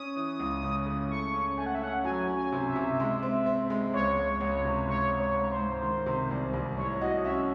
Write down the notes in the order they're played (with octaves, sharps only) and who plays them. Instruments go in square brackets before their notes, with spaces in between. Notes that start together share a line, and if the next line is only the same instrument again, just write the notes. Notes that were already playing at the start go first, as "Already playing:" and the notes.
Already playing: [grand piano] C#4 [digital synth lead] D#6
[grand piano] E3
C#2
C#3
C#3
[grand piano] A3 [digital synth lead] C#6
[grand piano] C#4
[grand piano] A3 [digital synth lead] G#5
[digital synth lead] F#5
E5
[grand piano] C#4 [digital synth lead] F#5
[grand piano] F#3 [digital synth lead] G#5
[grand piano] C#4
[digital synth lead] G#5
[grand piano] C3
[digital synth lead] E5
[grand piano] C3
G#3
C4
C4
G#3
[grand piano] C#2 [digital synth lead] C#5
[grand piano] C#2
C#2
C3
[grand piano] G#2 [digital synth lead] C#5
[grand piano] G#2
[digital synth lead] C#5
[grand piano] G#2
[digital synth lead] C5
[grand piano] G#2
D#3
C3
C2
C2
[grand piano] A2 [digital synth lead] C#5
[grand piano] F#4 [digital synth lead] D#5
[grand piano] C#4 [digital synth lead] E5